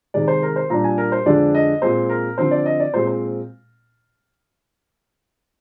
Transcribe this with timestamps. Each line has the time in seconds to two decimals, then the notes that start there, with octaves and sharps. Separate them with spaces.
0.14 C3 D#3 G#3 D5
0.28 C5
0.43 A#4
0.56 C5
0.70 A#2 G3 D4 A#5
0.84 G#5
0.98 A#4
1.12 C5
1.26 F2 D3 G#3 D4 D5
1.55 D#5
1.82 A#2 G#3 C4 C5
2.10 A#4
2.38 D3 F3 C4 C5
2.51 D5
2.66 D#5
2.80 D5
2.94 A#2 G#3 C4 C5
3.07 C5